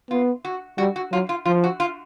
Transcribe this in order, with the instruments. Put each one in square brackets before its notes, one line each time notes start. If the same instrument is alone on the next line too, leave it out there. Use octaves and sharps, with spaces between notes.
[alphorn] B3 [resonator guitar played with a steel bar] F4
[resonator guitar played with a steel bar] F#4
[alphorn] G3 [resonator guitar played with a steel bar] F#4
[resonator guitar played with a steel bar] F#4
[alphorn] F#3 [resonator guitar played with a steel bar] F4
[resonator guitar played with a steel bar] F4
[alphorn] F3 [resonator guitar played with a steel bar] F4
[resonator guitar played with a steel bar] F#4
F4